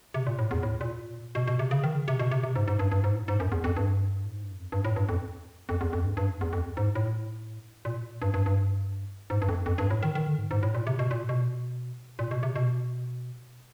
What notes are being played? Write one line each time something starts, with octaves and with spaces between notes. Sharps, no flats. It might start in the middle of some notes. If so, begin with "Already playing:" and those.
C3
A#2
A2
E2
A2
A#2
B2
B2
C3
C#3
D#3
C#3
C3
B2
C3
C3
G#2
G#2
G2
G2
G#2
A2
G#2
F#2
E2
F2
G2
A2
G#2
G2
F#2
F2
G2
A2
G2
F2
F2
E2
F2
G2
G2
F#2
E2
F2
G#2
A2
A#2
G2
G2
G2
G#2
G2
F2
F#2
F2
G2
A2
D#3
D#3
D3
G#2
G#2
A2
A#2
C3
B2
A#2
B2
A#2
B2
C3
B2